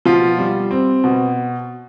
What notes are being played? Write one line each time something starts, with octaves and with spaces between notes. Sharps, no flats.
B2 F3 F4
G3
C4
B2